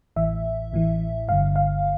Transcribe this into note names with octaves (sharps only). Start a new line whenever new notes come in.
A1 A2 E3 E5
A1 A2 E3
G1 G2 D3 F5
F5